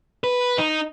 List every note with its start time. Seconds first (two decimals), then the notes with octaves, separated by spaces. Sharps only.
0.24 B4
0.58 D#4